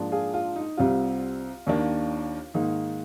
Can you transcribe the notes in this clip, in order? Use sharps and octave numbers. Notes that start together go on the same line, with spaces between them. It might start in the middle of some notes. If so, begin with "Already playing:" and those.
Already playing: G#2 F3 A#3 D4
F4 G#4
F4
D#4
C2 C3 G3 C4 F4
D#2 D#3 A#3 D4
G#2 D#3 A#3 D#4